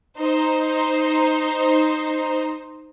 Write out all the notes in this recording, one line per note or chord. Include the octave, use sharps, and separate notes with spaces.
D#4 C5